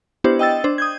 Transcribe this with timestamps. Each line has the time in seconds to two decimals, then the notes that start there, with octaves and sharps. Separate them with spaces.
0.24 B3 D4 E4 G4 C5
0.39 D#5 G5 E6 A6
0.64 D4 C5
0.78 D#6 G6 G#6